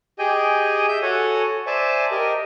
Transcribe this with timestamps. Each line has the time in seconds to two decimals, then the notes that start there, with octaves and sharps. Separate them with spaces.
0.19 G4 G#4 D#5 G5 G#5
0.89 E5 G6
1.02 F#4 A4 C#5 F#5 G#5
1.67 C5 D5 E5 G#5 A5
2.11 G4 A#4 D#5